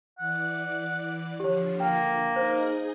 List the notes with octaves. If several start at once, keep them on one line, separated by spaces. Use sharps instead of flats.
E3 D5 F#5
D3 F3 G4 C#5
A#3 G5
D#4 G#4 C5 D#5